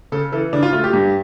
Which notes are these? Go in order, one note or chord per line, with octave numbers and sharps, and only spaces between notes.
C#3 A4
E3 A4
C#3 D4
F4
A3 F4
G4
G2